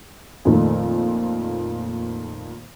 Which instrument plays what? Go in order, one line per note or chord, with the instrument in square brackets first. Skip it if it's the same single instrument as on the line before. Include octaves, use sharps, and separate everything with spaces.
[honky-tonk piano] F2 A#2 D#3 A3